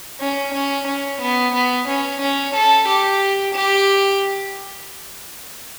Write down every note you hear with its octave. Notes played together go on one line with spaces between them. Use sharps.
C#4
C#4
C#4
B3
B3
C#4
C#4
A4
G4
G4